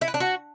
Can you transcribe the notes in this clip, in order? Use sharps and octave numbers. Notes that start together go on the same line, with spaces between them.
E4
B4
D4
F#4